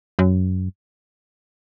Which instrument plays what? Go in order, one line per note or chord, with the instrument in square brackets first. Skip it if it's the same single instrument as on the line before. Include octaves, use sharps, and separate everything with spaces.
[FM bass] F#2